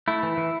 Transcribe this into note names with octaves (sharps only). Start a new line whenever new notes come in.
A3 E4
E3
E3